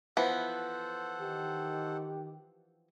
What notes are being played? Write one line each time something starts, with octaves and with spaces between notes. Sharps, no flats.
E3 F3 B3 A4 C5 F#5
D#3 G4